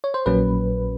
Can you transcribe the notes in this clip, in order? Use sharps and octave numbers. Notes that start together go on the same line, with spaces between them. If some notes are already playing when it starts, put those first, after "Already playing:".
C#5
C5
A#1 A#2 F#3 A#3 C#4 B4